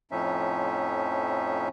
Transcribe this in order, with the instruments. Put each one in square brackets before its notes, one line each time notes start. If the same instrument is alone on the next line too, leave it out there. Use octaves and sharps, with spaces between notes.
[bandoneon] F2 A2 F3 C#4 D#4 E5